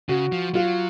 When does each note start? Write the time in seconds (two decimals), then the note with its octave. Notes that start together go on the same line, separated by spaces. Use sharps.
0.09 C#3 F#4
0.32 F3
0.54 F#3 F4